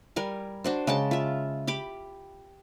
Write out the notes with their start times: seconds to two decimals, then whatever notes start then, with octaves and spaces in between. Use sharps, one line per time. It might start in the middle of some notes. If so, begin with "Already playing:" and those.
0.16 G3 A#4 G#5
0.64 D4 F#4 C5
0.87 C#3 G#3 G5 A5
1.11 F4 E5
1.67 G4 B5 D6